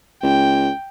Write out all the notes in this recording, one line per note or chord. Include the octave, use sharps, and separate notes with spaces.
C#2 G5